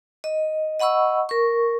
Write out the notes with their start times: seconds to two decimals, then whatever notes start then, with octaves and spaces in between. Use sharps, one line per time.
0.24 D#5
0.79 D#5 F#5 B5 C#6 E6
1.29 A#4 C#6